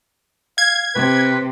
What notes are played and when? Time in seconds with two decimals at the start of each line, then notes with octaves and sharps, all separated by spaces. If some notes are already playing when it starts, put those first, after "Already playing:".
0.58 F5 G#6
0.95 C3 B4